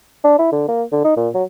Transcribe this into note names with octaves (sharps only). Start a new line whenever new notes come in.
D4
E4
D3
A#3
D3
D#4
A#2
F#3